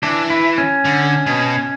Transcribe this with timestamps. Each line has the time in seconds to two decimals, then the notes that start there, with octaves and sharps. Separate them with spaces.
0.03 E3 D4
0.30 E4
0.58 C#4
0.85 D3
1.26 B2